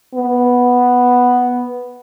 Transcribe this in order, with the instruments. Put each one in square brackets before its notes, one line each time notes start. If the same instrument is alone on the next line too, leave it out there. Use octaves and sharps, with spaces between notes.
[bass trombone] B3